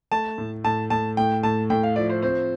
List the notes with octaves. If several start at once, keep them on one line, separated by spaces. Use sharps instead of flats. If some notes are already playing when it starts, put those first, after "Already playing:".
A3 A5
A2
A2 A5
A2 A5
A2 G5
A2 A5
A2 G5
F5
F3 D5
C5
C4 C5